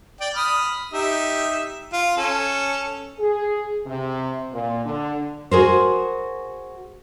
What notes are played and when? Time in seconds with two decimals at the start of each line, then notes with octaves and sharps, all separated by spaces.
0.20 D5 G5
0.35 B5 D#6 F6
0.93 D#4 G4 E5
1.93 F4
2.17 C#4 A4
3.19 G#4
3.86 C3
4.53 A#2
4.84 D3
5.51 F#4 G#4 A#4 C5